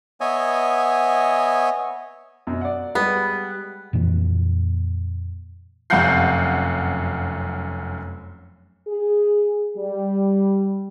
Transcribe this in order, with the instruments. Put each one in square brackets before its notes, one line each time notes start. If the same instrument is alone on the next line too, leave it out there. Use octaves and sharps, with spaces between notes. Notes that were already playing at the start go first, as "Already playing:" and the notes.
[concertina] B3 C#5 D#5 E5 G#5
[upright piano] F#2 B2
D5 F#5
[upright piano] G3 G#3 [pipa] B3
[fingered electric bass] F2 A#2 E3 A#3
[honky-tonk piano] F1 F#2 F5 F#5 G6 C7
[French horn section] G#4
G3